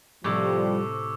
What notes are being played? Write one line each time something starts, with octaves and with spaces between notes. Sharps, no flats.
A2 C3 F3 G3 C#6 D6 E6